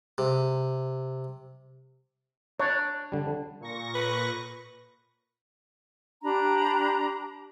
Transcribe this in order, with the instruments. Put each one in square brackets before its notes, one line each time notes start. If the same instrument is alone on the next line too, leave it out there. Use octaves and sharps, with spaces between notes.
[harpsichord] C3
[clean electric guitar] D4 [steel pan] C#5
[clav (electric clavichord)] D3 G3
[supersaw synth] A#2 C#6 A#6
[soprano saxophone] B4
[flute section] D4 G4 A#5 B5